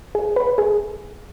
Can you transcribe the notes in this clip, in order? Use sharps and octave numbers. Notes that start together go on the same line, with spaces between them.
G#4
B4
G#4